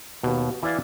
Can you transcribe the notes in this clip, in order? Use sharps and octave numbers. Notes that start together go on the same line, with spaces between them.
D#2 B2
E3 E4 D5 F5